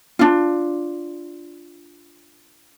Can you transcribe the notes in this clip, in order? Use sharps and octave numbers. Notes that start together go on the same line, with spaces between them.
D4 F4